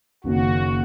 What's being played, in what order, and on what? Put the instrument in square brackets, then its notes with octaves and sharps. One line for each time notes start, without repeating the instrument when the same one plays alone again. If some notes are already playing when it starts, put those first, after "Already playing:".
[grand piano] F#1 F#2 D#3 A#3 C#4 [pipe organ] F#4